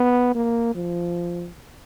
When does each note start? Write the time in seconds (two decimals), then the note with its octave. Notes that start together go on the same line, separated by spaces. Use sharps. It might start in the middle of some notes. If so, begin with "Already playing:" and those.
Already playing: B3
0.35 A#3
0.75 F3